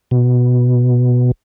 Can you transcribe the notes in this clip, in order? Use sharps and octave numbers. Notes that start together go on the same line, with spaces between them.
B2